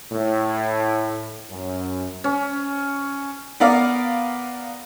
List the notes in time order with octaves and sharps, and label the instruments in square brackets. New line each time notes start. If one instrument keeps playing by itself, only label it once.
[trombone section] A2
F#2
[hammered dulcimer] C#4
[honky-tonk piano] B3 A#4 D5 F5